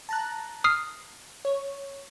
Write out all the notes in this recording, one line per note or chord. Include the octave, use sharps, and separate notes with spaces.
A5 A#5 F#6
D#6 F6 C7
C#5